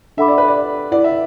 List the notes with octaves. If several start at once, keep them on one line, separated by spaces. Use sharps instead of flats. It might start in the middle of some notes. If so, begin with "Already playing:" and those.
D4 A4 E5 F#5 B5 D6
D5
B4
D5
E4 B4 D5 F#5
E5